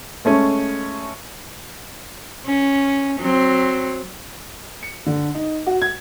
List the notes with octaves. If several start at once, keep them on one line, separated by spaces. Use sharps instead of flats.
G#3 A3 C#4
C#4
F#3 C4
C#7
D3
D#4
F#4
G#6